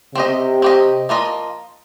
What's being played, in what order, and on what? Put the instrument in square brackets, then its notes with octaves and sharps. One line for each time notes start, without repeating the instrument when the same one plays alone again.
[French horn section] C3 [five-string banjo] C4 G4 D#5
[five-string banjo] C4 G4 D#5
F3 A#3 F4 D#5